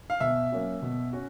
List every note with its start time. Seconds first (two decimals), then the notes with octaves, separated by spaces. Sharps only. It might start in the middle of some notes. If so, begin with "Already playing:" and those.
0.10 F5
0.20 B2 E5
0.52 F#3 A#3 C#4 F#4
0.82 B2
1.13 C#4 F#4